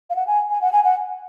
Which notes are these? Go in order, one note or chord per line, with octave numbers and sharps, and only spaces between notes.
F5
F#5
G#5
G#5
F#5
G#5
F#5